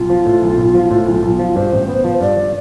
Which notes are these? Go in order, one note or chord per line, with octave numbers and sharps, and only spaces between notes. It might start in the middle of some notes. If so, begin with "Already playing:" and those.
Already playing: B1 F4
F3
A2
B1
B1
F3
A2
B1
B1
F3
G2 C5
A1
B3
F3
G2 D5